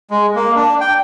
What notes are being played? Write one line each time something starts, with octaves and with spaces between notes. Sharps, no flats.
G#3
A#3
D4
G5